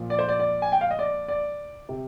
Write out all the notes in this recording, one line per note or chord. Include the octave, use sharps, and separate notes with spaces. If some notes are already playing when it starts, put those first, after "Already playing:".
Already playing: A#2 F3
D5
C5
D5
D5
G#5
G5
F5
D#5
D5
D5
C3